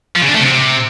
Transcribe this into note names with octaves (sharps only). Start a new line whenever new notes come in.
F3
C#3
D4
A3
C3